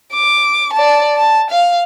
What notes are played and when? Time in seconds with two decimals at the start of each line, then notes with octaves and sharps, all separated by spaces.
0.14 D6
0.74 D5 A5
1.17 A5
1.51 F5